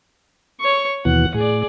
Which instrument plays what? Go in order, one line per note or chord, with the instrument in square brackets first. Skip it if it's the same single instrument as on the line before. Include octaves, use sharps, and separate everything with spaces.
[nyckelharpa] C#5 C#6
[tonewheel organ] D#2 B2 E3 [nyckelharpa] F#5
[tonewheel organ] A2 [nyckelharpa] G#4 D5